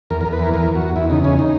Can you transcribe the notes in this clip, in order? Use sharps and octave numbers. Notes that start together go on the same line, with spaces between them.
E2 A#4
A#4
E2
B4
E3 A#4
E2 A#4
E2
F#4
E2
E2 E4
C#3 D#4
E2 C#4
D#4